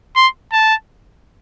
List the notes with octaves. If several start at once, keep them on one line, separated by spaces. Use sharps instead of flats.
C6
A5